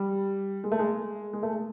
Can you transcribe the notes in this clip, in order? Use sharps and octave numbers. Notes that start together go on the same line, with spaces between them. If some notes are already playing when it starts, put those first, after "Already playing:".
Already playing: G3
G#3
A3
G#3
G#3
A3